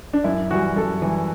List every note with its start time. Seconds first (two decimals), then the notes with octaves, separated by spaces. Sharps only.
0.13 D4
0.24 F#2 E4
0.51 E3 G3 F#4
0.76 F#2 A4
1.02 E3 G3